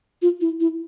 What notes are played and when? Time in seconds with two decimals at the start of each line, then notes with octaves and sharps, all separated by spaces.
0.22 F4
0.41 E4
0.60 E4